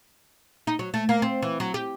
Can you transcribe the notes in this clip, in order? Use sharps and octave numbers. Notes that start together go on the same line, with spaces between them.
D#4
F#3
A3
A#3
C4
E3
F#3
G4